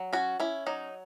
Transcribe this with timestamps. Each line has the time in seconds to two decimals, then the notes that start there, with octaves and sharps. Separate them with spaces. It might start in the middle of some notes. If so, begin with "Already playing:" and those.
Already playing: F#3
0.13 C#4 F#4
0.40 C#4 E4
0.67 F#3 D#4